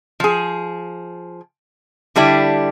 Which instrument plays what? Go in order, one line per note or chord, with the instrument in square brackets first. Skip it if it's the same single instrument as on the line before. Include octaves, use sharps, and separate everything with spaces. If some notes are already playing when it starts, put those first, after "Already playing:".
[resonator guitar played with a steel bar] F3 G#4
D3 G3 D4 E4